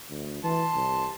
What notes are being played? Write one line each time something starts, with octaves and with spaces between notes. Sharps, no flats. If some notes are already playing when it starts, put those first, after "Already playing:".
D2
E3 A5 C6
C2